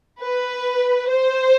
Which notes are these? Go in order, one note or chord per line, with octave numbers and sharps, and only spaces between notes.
B4
C5